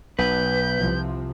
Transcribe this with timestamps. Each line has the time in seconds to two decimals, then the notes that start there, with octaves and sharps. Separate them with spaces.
0.19 B1 B4 G6
0.76 C2 C3 F3